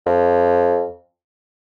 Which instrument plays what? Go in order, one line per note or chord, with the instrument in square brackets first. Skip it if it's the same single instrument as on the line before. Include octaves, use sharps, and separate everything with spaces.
[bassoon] F2